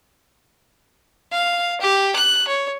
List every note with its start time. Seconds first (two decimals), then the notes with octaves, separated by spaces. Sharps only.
1.32 F5
1.81 G4
2.16 F#6
2.47 C#5